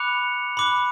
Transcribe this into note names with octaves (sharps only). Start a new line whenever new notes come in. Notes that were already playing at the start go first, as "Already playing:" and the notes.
Already playing: B5 D6 F#6 C#7 F7
B5 D6 F#6